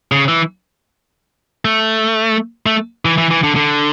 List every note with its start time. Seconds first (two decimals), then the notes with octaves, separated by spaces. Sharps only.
0.12 C#3
0.28 E3
1.65 A3
2.66 A3
3.05 E3
3.18 E3
3.31 E3
3.43 D3
3.56 D3